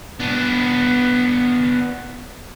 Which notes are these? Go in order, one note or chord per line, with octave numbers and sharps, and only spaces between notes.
B3 D4